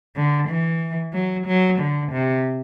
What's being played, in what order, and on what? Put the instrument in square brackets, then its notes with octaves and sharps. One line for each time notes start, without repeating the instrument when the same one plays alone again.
[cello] D3
E3
F#3
F#3
D3
C3